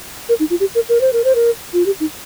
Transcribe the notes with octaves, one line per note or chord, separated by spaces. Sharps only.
A#4
D#4
F4
G4
A#4
A#4
C5
A#4
C5
A#4
F4
G4
D#4